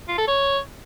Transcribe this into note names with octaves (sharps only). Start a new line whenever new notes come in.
F4
A4
C#5